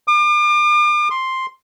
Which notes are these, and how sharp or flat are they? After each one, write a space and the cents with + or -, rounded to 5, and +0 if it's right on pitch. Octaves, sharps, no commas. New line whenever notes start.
D6 +40
C6 +5